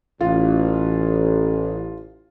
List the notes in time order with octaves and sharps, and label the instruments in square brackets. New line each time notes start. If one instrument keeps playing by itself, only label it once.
[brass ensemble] A1 [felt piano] F4